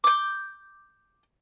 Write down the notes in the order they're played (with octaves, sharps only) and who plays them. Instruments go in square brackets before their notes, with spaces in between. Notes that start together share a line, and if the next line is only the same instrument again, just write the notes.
[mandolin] D6 G6